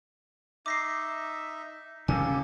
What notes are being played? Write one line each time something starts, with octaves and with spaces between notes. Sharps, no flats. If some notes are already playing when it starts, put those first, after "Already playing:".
D#4 E5 D6 A#6 C7
C#3 A#3 C#4 G4 A4 G#5